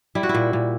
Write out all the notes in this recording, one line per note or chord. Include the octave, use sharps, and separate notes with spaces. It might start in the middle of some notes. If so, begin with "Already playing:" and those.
G3 E4
F#4
E4
A#2
A#2